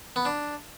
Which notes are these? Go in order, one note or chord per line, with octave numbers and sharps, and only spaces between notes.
B3
D4